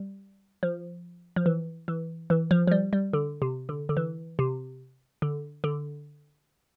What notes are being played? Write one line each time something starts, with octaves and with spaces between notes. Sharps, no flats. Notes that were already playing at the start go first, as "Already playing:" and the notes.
Already playing: G3
F3
F3
E3
E3
E3
F3
F3
G3
G3
D3
C3
D3
D3
E3
C3
D3
D3